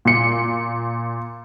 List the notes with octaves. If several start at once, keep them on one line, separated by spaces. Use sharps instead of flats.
A#2 C#7